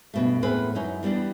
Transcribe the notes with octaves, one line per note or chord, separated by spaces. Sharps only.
G2 B2 A3
E2 A2 C4 G#4 B4
F#2 C#4 D#4 E4
E3 G3 B3 D4